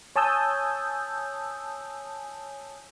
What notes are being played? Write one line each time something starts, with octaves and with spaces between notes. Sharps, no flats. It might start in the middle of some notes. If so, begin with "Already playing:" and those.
C#5 G#5 A5 D#6 E6 G6